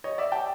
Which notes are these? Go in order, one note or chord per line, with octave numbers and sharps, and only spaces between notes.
C#5 D#5
D5 E5
G5 A5